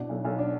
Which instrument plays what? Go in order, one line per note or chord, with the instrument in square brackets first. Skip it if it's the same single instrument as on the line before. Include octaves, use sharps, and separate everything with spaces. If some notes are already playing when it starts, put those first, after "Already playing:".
Already playing: [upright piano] B2 D4 E4
B1
B1
D4